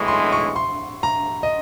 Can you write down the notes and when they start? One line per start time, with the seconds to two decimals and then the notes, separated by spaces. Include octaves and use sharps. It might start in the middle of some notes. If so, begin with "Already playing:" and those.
Already playing: B1 A2 E3 G#3 C#6
0.08 C6
0.32 C#6
0.56 C6
1.03 A#5
1.43 D#5